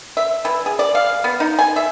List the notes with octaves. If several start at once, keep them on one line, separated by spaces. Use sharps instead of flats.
E5
E3
G#4
D5
F5
B3
D#4
G#5
E5